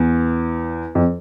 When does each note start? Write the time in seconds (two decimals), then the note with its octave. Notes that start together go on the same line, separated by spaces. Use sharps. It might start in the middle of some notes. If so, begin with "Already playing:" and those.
Already playing: E2
0.95 F2